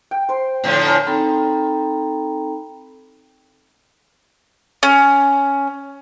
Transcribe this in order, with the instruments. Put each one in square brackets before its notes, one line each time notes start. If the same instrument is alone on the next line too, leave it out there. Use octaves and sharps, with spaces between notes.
[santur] G5
C5 C6
[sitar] A2 D3 F3
[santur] A#4 F#5 G#5
[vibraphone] C4 D#4 A4 G5 A#5 B5
[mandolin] C#4